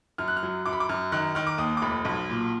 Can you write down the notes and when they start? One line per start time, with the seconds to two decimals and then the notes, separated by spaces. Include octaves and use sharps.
0.18 F#2 F6
0.28 F#6
0.37 F6
0.43 F#3
0.66 F#2 D6
0.73 B5
0.80 D6
0.89 F#2 F6
1.12 D#3 F#6
1.35 D#3 F6
1.47 D6
1.58 D#2 D#6
1.77 D6
1.82 F1 B5
2.05 B1
2.29 A#2